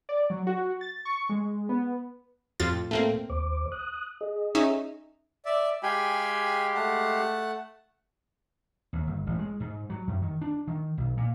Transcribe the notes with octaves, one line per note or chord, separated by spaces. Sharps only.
D5
F#3
F#4
A6
C#6
G#3
B3
F2 A2 F4 A6
A3 A#3 C4
D#2 C5 D6
D#6 F#6
G#4 D#5
C#4 D#4 E5
D5 E5
G#3 G4 F5 G5 G#5 B5
A3 F#5 A5
D#2
G1
A1
G#3
G#2
F#3
F#2
D#3
D4
D#3
B1
A#2